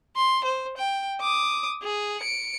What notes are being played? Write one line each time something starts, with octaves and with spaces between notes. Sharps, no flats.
C6
C5
G5
D6 D#6
G#4
C#7 D7